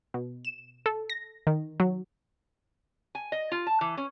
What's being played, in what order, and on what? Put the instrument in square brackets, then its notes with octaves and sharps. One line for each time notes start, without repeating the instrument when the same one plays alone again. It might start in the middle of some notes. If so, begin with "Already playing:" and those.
[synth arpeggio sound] B2
E7
A4
A#6
D#3
F#3
[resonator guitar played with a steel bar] G#5
D#5
F4
A5
E3
C#4